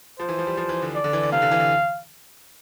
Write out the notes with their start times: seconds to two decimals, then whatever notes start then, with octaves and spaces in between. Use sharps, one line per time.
0.19 F3 C5
0.29 E3
0.39 F3
0.47 G3
0.57 F3
0.69 E3
0.82 D3
0.95 D5
1.04 D3
1.13 E3
1.23 D3
1.32 C3 F5
1.42 D3
1.52 E3
1.60 D3